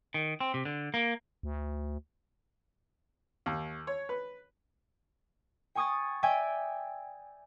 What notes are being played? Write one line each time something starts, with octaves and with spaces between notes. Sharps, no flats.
D#3
C4
C3
D3
A#3
D2
D#2
C#5
B4
G5 G#5 C#6 D#6 G#6 A6
D5 E5 G5 G#5 G#6